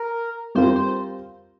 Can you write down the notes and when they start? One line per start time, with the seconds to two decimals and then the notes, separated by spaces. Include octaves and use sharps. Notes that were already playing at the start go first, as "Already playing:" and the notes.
Already playing: A#4
0.55 G3 C4 F4 A#4 C5
0.76 C5